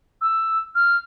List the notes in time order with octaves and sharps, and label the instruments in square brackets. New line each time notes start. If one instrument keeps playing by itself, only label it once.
[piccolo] E6
F6